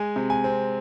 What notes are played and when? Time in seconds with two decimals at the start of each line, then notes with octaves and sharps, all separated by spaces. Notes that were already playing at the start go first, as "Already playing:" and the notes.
Already playing: G#3 G#5
0.16 C3
0.30 G#5
0.44 C4